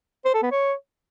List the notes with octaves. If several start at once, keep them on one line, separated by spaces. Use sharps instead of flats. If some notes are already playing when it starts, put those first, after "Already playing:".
C5
A4
B3
C#5